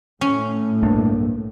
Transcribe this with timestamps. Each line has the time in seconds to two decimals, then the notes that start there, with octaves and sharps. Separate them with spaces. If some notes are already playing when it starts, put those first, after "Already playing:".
0.21 A2 C#4
0.83 B1 G2 A#3 D4